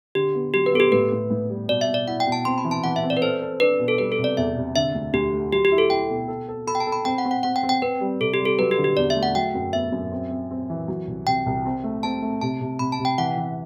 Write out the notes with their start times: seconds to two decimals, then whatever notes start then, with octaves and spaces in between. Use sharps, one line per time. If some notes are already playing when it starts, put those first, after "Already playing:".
0.15 D3 G4
0.35 B3
0.54 F#3 G4
0.66 B4
0.73 B3 A4
0.80 G4
0.92 A2 B4
1.12 A2
1.30 A2
1.49 G3
1.68 B2 D5
1.81 E5
1.88 B2
1.94 D5
2.08 E4 F#5
2.20 G5
2.26 B2
2.32 A5
2.45 C4 C6
2.58 B5
2.64 E3
2.71 A5
2.84 E3 F#5
2.96 E5
3.03 C4
3.10 D5
3.17 B4
3.22 A4 C5
3.42 A4
3.60 D4 B4
3.79 B2
3.88 A4
3.98 G3 B4
4.12 A4
4.19 C3
4.24 D5
4.37 E2 E5
4.57 C3
4.76 D3 E5
4.95 D2
5.13 D2 G4
5.33 A3
5.52 F#3 G4
5.65 G4
5.72 E4
5.78 A4
5.90 E4 G5
6.09 B2
6.28 A4
6.48 A4
6.67 A4 B5
6.75 G5
6.80 A5
6.87 A4
6.92 B5
7.05 C4 G5
7.18 F#5
7.25 C4
7.31 F#5
7.43 C4 F#5
7.56 G5
7.63 C4
7.69 G5
7.82 C4 B4
8.01 G3
8.20 C3 A4
8.34 G4
8.39 G3
8.45 A4
8.59 F#3 B4
8.71 G4
8.78 D3
8.84 G4
8.97 E2 D5
9.10 E5
9.16 A3
9.23 F#5
9.35 F#3 G5
9.55 F#2
9.73 B3 E5
9.92 F#2
10.12 C4
10.31 C4
10.51 C4
10.70 E3
10.88 F#3
11.07 C2
11.27 C3 G5
11.46 C2
11.66 C4
11.84 A3
12.03 C4 A5
12.22 A3
12.42 C3 A5
12.61 C3
12.79 C3 B5
12.92 A5
12.99 C3
13.05 G5
13.18 E3 F#5
13.37 E3